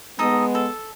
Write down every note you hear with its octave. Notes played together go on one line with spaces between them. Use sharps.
G#3 B3 D#4 A4 D#5
A4